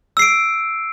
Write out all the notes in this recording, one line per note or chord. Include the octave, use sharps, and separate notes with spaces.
E6 C7 D7